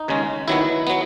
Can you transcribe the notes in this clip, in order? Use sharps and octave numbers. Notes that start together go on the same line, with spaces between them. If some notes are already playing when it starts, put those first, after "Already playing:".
Already playing: D#4
D#2 C#3 G#3 C#4
D#2 D#3 F#3 B3 E4
F#3 B3